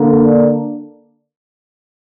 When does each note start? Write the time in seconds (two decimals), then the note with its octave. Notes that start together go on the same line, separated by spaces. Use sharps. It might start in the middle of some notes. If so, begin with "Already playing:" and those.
Already playing: D3 A#3
0.22 D4